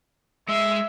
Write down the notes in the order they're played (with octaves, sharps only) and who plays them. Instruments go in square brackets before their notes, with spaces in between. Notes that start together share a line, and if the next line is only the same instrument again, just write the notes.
[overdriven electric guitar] G#3 [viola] E5